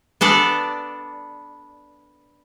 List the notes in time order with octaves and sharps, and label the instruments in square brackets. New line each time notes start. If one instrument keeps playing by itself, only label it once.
[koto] B3 D4 A4 D5